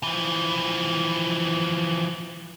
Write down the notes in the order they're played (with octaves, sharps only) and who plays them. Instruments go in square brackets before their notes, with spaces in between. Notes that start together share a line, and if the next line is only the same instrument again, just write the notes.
[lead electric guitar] E3 F3